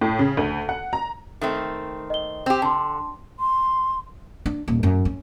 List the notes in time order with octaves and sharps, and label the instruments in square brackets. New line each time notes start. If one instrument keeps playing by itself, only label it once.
[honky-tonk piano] A2
C#3
D2
F#5
A#5
[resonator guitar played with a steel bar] D#3 A3 C4
[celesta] D#5 G7
[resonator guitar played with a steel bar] C4 G4
[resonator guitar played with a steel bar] D3 [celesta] A5 C6
[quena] C6
[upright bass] D4
D#1
F#2
C#4